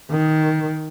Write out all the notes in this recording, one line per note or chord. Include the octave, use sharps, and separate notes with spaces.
D#3